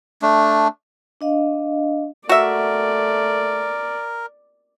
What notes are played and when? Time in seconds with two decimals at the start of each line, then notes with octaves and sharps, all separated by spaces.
0.22 A3 D4
1.21 D4 D#5 F5
2.29 A3 F#4 A#4 D5 E5